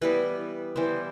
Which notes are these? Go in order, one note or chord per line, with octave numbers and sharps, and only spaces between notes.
E3 G3 B3 B4
E3 G3 B3 C5